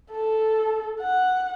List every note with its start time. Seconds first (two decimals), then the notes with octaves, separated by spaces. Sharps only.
0.12 A4
1.01 F#5